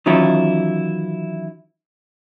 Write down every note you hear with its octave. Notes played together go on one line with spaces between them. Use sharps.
D#3 E3 F#3 C#4 E4 F4